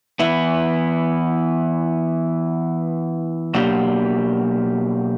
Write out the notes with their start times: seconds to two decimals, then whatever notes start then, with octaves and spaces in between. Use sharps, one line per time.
0.19 E3 B3 E4
3.54 B2 F#3 A#3 D4 G4